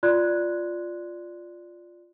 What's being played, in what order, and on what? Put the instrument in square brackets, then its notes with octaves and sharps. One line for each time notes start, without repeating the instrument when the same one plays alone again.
[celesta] F4 D5 C6 F#6 G#6